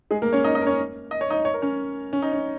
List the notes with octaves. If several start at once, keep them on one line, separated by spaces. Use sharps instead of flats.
G#3 G#4
A#3 A#4
C#4 C#5
D#4 D#5
D#4 D#5
A#4
C#4 C#5
D#5
C#5
D#4 D#5
C#5
A#4
C#4 C#5
C#4
D#4
C#4